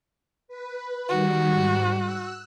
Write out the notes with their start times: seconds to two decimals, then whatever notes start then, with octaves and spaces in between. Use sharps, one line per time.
0.48 B4
1.09 D#3 G3 F#4
1.53 G#2 G3 F#6
1.95 E6 F#6